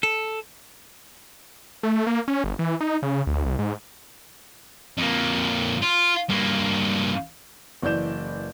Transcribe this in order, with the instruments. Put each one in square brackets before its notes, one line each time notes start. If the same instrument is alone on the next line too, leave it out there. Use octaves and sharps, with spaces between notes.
[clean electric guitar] A4
[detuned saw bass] A3
A#3
C#4
G1
E3
D#4
C#3
D2
C2
G#2
[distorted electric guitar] F2 A#3
F4
G2 A#3
[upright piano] F#1 E3 D5 G6 E7